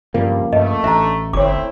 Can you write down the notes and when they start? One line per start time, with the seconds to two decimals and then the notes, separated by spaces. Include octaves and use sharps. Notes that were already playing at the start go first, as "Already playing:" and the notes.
0.14 G2 C#3 F3 G3 A#3
0.53 G2 A3 D#5
0.84 A1 D4 E5 A#5
1.33 G1 A3 C4 E4 C#5 D6